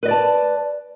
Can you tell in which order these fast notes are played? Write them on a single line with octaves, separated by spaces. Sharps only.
B4 D#5 D5 A5